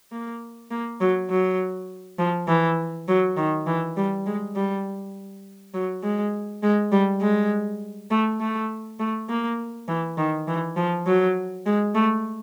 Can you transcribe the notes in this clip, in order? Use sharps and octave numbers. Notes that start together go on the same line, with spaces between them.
A#3
A#3
F#3
F#3
F3
E3
F#3
D#3
E3
G3
G#3
G3
F#3
G#3
G#3
G3
G#3
A3
A3
A3
A#3
E3
D#3
E3
F3
F#3
G#3
A3